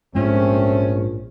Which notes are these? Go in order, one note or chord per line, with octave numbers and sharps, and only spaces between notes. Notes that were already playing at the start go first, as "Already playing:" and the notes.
A#1 G#2 F3 G#3 A3 C4 C#4